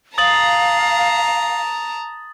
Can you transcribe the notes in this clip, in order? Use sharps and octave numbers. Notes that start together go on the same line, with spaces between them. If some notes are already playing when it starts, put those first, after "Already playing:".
F5 A5 A#5 D#6 A6 F#7